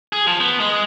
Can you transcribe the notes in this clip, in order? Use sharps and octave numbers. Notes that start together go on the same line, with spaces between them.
G#4
F3
B3
G#3